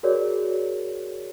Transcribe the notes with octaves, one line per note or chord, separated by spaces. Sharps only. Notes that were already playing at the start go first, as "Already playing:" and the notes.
F#4 G#4 A#4 C#5 D5